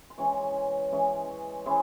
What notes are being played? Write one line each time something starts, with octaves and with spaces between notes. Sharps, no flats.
C6
E3 G#3 C#4 E4 C#5 C#6
E3 G#3 C#4 E4
E3 G#3 C#4 E4 C5 C6